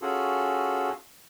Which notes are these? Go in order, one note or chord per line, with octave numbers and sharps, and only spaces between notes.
C#4 F4 F#4 G#4 A4